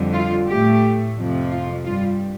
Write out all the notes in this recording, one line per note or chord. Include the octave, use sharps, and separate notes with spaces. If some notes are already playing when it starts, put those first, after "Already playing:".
Already playing: F2 D3 G3
F4
A2 A3 G4
F2 C3 F3
F4
G2 G3 F4